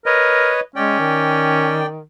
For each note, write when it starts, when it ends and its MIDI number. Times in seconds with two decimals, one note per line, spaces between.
0.06 0.50 70
0.06 0.60 71
0.06 0.60 73
0.06 0.60 75
0.76 0.96 56
0.76 1.87 61
0.76 1.86 74
0.76 1.86 79
0.99 2.03 51